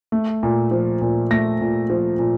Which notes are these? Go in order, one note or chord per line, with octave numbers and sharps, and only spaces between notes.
A3
A#2
F3
A#2
A3 A#6
A#2
F3
A#2